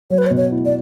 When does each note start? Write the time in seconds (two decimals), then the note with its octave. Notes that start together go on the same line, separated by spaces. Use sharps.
0.10 F#3 C#5
0.18 B4
0.26 C#5
0.30 B2
0.37 C#5
0.51 E4
0.65 D5